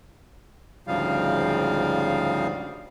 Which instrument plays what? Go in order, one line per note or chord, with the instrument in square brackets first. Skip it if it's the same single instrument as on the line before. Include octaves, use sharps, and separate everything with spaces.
[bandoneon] D2 G#2 C#3 F3 G3 F5